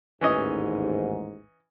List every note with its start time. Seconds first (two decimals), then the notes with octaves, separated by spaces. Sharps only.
0.21 A1 D#2 G#2 E3 C#4 D#5